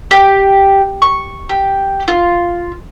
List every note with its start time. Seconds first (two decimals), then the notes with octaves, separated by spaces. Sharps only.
0.11 G4
1.02 C#6
1.49 G4
2.08 F4